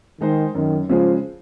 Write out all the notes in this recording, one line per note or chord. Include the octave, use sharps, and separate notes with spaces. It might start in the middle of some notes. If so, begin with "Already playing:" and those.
D#3 G#3 D#4 G#4 C5
F#2 D#3
C#3 F3 G#3